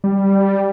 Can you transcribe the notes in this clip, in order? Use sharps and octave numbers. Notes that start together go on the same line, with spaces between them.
G3